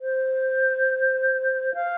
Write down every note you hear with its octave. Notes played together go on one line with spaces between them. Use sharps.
C5
F5